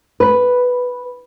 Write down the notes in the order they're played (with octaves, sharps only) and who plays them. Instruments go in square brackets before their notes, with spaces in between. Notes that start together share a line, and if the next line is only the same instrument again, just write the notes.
[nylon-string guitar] B4